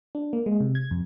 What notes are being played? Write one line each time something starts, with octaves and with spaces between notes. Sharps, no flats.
D4
A#3
G#3
C3
G#6
F2